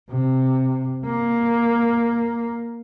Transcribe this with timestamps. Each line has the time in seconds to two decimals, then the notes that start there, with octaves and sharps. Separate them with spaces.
0.10 C3
1.05 A#3